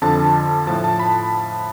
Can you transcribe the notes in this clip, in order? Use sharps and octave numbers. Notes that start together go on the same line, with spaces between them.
F2 D3 F3 A5
A2 F3 A5
A5
B5